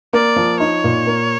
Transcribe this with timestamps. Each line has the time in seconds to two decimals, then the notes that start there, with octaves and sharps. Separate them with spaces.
0.13 A#3 D5
0.36 F3
0.60 D#4 C#5
0.84 A#2
1.07 A#3